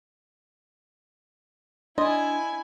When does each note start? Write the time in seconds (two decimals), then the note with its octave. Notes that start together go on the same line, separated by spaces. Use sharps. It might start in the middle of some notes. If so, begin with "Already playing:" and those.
1.98 D4 E4 D#5 G#5 C6